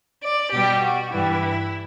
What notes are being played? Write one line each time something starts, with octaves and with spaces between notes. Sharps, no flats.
D5
B2 G3 G4
F#4
G2 E3 G3 E4